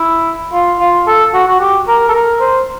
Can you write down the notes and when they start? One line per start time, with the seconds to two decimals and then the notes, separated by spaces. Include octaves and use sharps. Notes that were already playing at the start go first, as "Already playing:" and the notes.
Already playing: E4
0.53 F4
0.79 F4
1.07 A4
1.34 F#4
1.48 F#4
1.60 G4
1.88 A#4
2.09 A4
2.14 A#4
2.41 C5